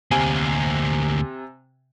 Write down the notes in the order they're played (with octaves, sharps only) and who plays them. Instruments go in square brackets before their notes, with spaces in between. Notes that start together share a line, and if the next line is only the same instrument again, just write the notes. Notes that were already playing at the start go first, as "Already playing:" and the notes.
[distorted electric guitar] D2 A#3 [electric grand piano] C3 G#5 D#7